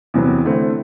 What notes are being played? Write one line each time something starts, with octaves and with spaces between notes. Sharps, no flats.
E2 C3 F#3 B3
D3 A3 C4 E4